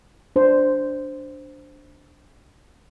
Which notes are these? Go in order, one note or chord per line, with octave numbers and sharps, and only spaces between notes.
D4 C5